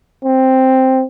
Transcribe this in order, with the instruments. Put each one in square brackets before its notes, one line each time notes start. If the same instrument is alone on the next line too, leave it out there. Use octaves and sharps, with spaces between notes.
[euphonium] C4